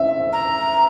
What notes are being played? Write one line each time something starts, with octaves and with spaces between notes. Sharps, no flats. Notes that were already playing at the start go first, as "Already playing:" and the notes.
Already playing: E5
A#5